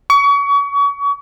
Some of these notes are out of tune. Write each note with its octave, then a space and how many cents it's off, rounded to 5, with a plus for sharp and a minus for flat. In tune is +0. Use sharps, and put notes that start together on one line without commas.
C#6 +35